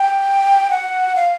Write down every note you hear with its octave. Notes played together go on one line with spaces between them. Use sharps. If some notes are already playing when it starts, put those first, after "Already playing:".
Already playing: G5
F#5
F5